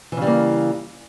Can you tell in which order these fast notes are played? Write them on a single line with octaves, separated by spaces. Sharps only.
E3 C#3 G3 A#3